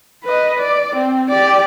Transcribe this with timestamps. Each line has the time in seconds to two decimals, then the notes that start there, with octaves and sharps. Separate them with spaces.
0.24 B4 D#5
0.58 D5
0.95 C4
1.30 G4 D5